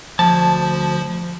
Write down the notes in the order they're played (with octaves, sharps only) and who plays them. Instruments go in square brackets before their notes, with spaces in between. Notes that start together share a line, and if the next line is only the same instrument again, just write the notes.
[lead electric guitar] D2 A5 [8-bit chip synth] F3